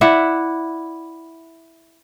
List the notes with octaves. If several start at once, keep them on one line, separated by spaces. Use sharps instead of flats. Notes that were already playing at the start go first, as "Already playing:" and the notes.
E4 D5 E5 F#5